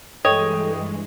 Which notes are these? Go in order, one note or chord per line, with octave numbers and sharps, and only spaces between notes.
G2 E3 G#3 A4 C#5 D#5 G5 D#6